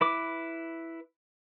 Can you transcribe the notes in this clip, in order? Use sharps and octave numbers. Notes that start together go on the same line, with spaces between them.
E4 B4 D6